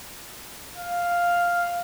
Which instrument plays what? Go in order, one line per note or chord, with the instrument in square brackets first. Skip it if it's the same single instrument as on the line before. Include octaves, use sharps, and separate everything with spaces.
[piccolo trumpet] F5